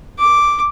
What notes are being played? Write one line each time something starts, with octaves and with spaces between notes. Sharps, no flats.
D6